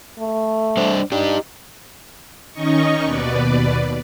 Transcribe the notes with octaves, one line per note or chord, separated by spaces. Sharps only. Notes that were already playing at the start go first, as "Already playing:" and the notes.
A3
G3 D4 C5
D4 D#4 G4
D#3 C#4 D#4 D#5 C#6
D#2 B2 B4 D5